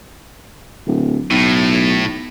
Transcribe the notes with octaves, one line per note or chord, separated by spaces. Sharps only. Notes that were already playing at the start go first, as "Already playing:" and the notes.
D1
B1 A2